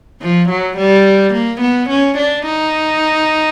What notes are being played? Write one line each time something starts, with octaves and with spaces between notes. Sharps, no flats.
F3
F#3
G3
A#3
B3
C#4
D4
D#4